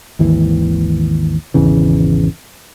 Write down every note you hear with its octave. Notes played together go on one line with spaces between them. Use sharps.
G#1 D#2 E3
G#1 E2 C#3 E3